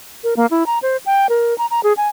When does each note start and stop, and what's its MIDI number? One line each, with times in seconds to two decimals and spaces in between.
0.24 0.34 70
0.37 0.46 58
0.51 0.66 64
0.66 0.79 82
0.83 0.97 72
1.06 1.27 79
1.29 1.57 70
1.58 1.66 82
1.71 1.80 82
1.83 1.93 68
1.97 2.08 80